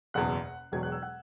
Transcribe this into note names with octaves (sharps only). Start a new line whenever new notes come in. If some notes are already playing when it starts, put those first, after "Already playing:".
F#1 E2 B2 F#5 F#6
E1 E2 B2 F#3 G#6
F#6
E6
F#5 F#6